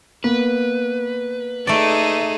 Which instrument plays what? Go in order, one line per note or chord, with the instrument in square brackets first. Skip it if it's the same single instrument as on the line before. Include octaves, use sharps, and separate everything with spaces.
[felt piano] A#3 B3 [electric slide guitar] B4
[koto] A3 D5 [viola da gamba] D#4 G#4 A4